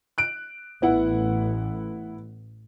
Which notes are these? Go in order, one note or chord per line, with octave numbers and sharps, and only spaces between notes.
F#6 D7
A1 B3 E4 F#5